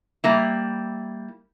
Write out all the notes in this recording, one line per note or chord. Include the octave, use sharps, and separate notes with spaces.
G3 A#3 E4